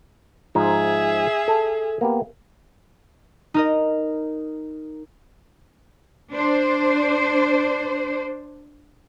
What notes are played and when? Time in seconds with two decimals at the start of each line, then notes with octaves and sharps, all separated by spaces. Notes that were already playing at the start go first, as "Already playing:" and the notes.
0.55 G#2 F3 D#4 G#4 E5
1.48 A4
2.01 A#3 B3 G4
3.54 D#4 A#4 D#5
6.33 D4 C5